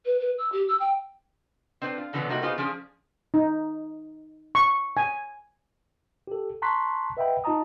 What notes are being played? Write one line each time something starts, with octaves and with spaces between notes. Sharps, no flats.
B4
B4
E6
G4
E6
G5
C4 D4 B4 C5
F4
B2 D3 E3 F#3 B3 D4
C3 G3 A#3 D#4 F#4
B3 D#4 F4 F#4 G#4 C5
F3 C#4 D4 G#4
D#4
C#6
G#5
G4 A4
A5 A#5 C6 C#6 F#6 B6
B4 D#5 E5 F#5 G5 B5
D#4 F4 D#5 A5 A#5 D#6